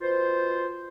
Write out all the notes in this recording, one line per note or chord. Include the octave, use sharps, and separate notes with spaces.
B2 F4 C5